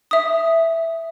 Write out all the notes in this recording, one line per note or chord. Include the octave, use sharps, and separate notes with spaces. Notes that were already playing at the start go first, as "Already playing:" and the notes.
E5 D#6